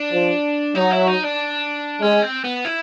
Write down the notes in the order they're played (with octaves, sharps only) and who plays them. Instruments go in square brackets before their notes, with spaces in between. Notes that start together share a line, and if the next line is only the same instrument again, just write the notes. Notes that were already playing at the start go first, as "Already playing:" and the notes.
Already playing: [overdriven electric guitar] D4
[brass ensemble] F3
[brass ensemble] F#3 [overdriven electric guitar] D#4
[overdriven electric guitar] E4
D#4
D4
[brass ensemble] G#3 [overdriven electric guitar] C#4
[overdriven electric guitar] C4
B3
E4